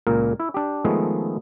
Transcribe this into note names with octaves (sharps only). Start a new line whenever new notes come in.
C#2 A#2 A#3 A#4
E4
D4 G4
D#3 F3 G#3 A3 B3 G#4